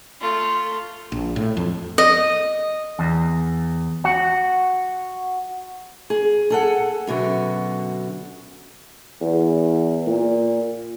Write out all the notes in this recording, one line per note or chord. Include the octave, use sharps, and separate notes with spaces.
A3 F4
A#1
A2
F2
D#5
E2
F#4
G#4
G#4 A4 F#5
F#2 B2 D3 F#4
E2
A#2